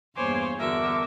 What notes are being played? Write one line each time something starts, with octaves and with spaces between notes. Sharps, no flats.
E2 G2 A#3 C5 C#5 G#5 C6 D6
E2 D3 F#4 A#4 E5 D6